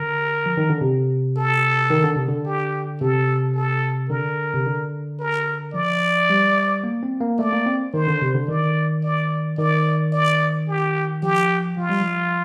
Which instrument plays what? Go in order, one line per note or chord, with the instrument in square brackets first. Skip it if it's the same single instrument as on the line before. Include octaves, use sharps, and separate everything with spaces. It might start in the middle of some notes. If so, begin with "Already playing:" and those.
Already playing: [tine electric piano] D3 [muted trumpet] A#4
[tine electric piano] F3
D#3
D3
C3
[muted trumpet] A4
[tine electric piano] D#3
D3
C3
D3
[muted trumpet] G4
[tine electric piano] C3 [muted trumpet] A4
[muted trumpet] A4
[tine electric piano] D3 [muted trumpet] A#4
[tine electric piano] C3
D3
[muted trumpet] A#4
[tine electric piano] F3 [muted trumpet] D5
[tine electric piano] G3
A#3
C4
A#3
[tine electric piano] A3 [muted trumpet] D5
[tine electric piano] A#3
C4
[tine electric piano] D#3 [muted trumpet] C5
[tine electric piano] D3
C3
D3
[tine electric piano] D#3 [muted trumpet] D5
[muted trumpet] D5
[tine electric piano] D#3 [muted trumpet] D5
[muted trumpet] D5
G4
[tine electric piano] F3 [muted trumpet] G4
[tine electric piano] F3 [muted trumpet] F4
[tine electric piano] G3
F3